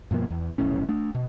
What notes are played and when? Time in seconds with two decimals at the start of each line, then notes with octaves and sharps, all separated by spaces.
0.11 G2 B2 F3 A#3
0.30 E2
0.58 F1 B1 A2 C#4
0.89 A3 D4
1.15 B2